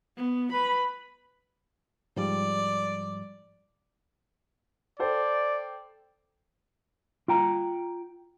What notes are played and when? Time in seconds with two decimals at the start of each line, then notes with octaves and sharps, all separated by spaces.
0.17 B3
0.53 B4 B5
2.17 G#2 F3 G3 D5
4.99 A4 C5 D5 G5
7.28 F4 G5 A#5